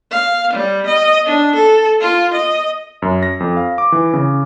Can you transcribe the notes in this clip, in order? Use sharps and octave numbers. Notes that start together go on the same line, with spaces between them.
F5
G3
D#5
D4
A4
F4
D#5
F#2
A#6
F2
F5
D6
E3
C#3